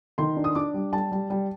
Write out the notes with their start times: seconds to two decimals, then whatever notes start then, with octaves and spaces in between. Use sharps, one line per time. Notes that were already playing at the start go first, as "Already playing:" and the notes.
0.18 D#3 C6
0.36 D4
0.44 D#6
0.55 D4 D6
0.74 G3
0.93 G3 A5
1.12 G3
1.30 G3